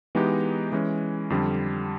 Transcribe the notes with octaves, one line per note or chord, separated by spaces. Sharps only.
E3 G#3 B3 D#4 G4
E3 G#3 C#4
F2 D3 G3